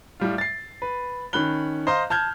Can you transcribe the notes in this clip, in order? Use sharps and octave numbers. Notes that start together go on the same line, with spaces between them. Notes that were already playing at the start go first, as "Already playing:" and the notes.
A2 G3 F4
A6 C7
B4
D#3 C#4 B5 F#6 G7
C5 D#5 F5 A#5 C6
A5 F6 G6 G#6